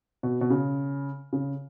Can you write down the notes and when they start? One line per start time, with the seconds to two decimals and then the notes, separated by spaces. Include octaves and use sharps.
0.23 B2
0.41 B2
0.50 C#3
1.33 C#3